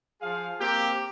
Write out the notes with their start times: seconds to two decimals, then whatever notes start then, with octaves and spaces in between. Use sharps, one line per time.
0.22 F3 G#4 F5
0.60 A#3 C4 G4